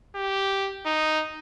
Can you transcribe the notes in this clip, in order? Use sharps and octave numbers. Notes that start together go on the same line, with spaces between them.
G4
D#4